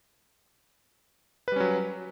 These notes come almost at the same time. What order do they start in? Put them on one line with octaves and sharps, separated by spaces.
B4 G3 C#4 F#3